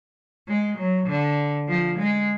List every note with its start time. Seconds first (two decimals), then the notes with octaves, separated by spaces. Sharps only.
0.47 G#3
0.77 F#3
1.07 D3
1.68 F3
1.98 G#3